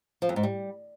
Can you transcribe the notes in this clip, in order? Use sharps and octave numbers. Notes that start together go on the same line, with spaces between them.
F3
F2
G#2
G3